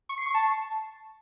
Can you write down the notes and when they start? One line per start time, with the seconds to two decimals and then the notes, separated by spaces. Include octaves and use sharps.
0.09 C#6
0.18 C7
0.26 C#6
0.34 A5